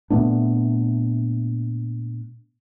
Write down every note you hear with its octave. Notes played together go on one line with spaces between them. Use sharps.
A#2 A3 B3 D4